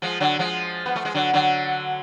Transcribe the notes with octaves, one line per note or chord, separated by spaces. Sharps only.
F3 G#3
D3 F#3
F3 G#3
B3
A3
G#3
D3 F#3
D3 F#3